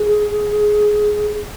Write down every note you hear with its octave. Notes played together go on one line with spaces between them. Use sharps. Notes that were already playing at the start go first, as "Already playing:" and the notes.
Already playing: G#4